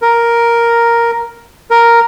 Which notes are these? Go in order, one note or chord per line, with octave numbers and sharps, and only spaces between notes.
A#4
A#4